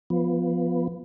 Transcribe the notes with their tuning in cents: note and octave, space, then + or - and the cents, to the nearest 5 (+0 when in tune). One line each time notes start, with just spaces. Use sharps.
F3 +0 B3 +0